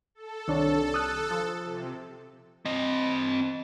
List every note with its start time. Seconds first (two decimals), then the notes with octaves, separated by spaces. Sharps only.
0.15 A4
0.48 C2 D#3 D4 C#5
0.94 D#6 F#6
1.31 F3
1.62 C3
2.65 C4 D#5